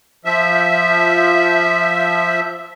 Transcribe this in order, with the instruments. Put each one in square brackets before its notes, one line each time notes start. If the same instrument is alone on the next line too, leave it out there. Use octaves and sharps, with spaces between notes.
[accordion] F3 E5